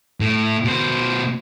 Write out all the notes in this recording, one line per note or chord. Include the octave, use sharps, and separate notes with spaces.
A2
B2 C5